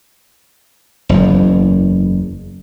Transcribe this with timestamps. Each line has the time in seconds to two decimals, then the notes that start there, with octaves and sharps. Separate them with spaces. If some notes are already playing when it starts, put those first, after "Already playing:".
1.09 F#1 E2